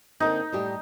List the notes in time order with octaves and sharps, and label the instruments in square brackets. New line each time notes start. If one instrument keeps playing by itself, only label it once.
[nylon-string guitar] D3 A#3 C4 [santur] D#4
[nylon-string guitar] A2 G3 G4